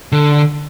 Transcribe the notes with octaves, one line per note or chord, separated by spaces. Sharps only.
D3